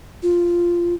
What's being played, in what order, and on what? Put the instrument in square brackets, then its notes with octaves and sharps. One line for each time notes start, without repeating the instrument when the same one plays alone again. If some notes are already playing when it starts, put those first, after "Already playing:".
[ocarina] F4